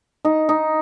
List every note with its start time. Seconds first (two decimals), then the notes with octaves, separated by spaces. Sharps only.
0.25 D#4
0.49 D#4